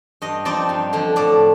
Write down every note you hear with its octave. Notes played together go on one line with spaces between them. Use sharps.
G2 D#5
F3 C4 D#4 D5
G2
D3 F3
A2 D5